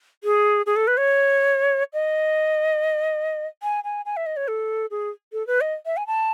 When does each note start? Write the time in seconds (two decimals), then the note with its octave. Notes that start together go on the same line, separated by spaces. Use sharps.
0.24 G#4
0.66 G#4
0.76 A4
0.87 B4
0.97 C#5
1.93 D#5
3.63 G#5
3.84 G#5
4.05 G#5
4.16 E5
4.26 D#5
4.37 C#5
4.48 A4
4.91 G#4
5.33 A4
5.47 B4
5.61 D#5
5.86 E5
5.97 G#5
6.07 A5